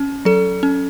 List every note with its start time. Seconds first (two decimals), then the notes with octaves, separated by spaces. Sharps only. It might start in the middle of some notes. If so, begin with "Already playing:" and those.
Already playing: C#4
0.25 F#3 A4
0.63 C#4